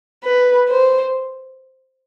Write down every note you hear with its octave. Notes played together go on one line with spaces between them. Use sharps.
B4
C5